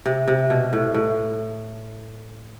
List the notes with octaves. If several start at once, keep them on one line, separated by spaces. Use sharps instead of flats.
C3
C3
B2
A2
A2